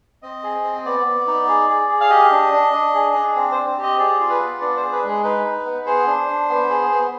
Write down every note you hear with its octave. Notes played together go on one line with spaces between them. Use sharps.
C4 D#5
G#4
C4
B3 D5
B3
D#4
G#4
G#4
G#4
F5
G4 D#5
D4
D4
D4
G#4
D4
C4
C4 C5
G4
D#5
G#4 D5
F4
B4
B3
D4 D5
G#4 C5
B4
G#3 G#4
D#4 B4
D#4
B3
G#4 C5
D4
D4
B3
G#4
B3